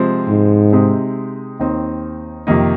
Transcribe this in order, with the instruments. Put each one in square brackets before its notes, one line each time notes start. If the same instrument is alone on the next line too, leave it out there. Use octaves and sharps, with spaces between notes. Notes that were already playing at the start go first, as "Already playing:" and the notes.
Already playing: [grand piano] C3 F3 G#3 C4
[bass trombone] G#2
[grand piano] C3 G#3 C4 D#4
D#2 D#3 C4 D#4
F2 C3 D#3 A#3 D#4